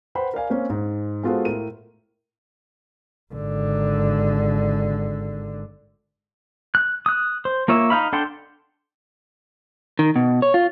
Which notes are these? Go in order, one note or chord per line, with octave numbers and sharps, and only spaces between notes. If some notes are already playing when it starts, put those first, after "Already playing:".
B4 C5 F#5 G5 B5
A#4 D5 F5 G#5
A#3 C4 C#4
G#2
G#3 B3 F4 F#4 A4 C5
A2 A#4 D#7
G#1 D3
F#6
D#6 F#6
C5
A#3 F4 C#5 E5
D#4 F5 B5
D4 A4 F#5 G5 C6
D#3
B2
C#5
F4